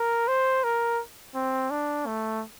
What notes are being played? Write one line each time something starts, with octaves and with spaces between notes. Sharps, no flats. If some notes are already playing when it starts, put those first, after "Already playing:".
Already playing: A#4
C5
A#4
C4
D4
A3